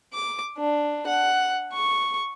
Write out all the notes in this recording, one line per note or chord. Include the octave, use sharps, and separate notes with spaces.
D6
D4
F#5
C#6